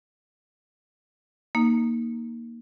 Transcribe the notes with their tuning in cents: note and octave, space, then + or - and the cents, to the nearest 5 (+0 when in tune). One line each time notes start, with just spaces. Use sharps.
A#3 +0 D#4 +0